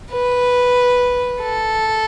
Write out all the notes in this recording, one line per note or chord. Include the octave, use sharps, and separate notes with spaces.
B4
A4